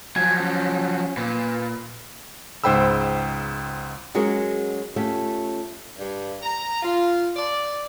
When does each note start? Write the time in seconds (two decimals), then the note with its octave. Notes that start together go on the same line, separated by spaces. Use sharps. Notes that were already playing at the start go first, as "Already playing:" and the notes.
0.16 F3 F#3 G#5
0.40 C#4
1.17 A#2 B4
2.64 C#2 G#2 C5 G5 B5 E6
4.14 F#3 G#3 C#4 F#4 G#4 A#4
4.96 A3 C#4 F4 G4
5.98 G2
6.43 A#5
6.82 F4
7.37 D5